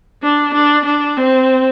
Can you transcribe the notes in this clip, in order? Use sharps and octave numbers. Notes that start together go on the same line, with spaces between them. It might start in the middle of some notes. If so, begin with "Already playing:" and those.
D4
D4
D4
C4